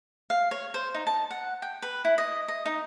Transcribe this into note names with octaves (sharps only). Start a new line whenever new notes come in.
F5
C#5
C5
D#4
A5
F#5
G5
B4
E4
D#5
D#5
D#4